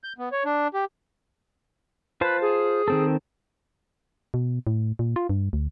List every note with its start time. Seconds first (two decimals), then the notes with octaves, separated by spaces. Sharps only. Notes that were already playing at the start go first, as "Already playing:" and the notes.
0.04 G6
0.18 B3
0.32 C#5
0.45 D4
0.74 G4
2.21 F4 B4 C5 A5
2.41 G#4
2.88 D#3 C4 A4
4.34 B2
4.67 A2
4.99 A#2
5.16 F4
5.29 G2
5.53 D2